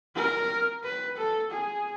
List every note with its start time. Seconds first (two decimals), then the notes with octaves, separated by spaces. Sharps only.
0.16 A#4
0.83 B4
1.17 A4
1.51 G#4